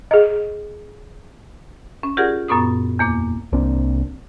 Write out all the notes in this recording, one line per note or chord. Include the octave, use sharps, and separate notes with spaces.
G#4 D#5
C#4
F4 G4 G#4 A#4 D5 F#5
F#2 A#2 B3 C#6 D#6
E2 A#3 D6
C2 A#3 C4 D4